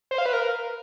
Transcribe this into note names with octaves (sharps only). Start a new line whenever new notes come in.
C5
F5
B4
A#4